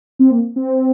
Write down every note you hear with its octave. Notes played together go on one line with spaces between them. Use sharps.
C4
A#3
C4